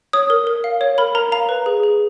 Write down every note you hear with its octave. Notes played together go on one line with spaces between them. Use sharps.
C#5 D#6
A#4
A#4
F5
C#5
A#4 B5
A#4 A#5
F5 A#5
B4
G#4
G#4